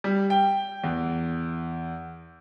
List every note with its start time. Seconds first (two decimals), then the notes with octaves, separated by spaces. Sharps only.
0.04 G3
0.30 G5
0.84 E2